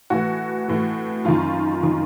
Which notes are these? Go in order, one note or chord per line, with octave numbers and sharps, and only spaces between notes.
A2 E3 F#4
A2 E3
F#2 D#3 F4
D#3